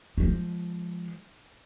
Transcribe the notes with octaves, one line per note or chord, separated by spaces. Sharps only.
F3 G#3